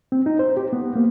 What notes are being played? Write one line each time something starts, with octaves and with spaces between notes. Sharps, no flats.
C4
D#4
C5
G4
B3
A#3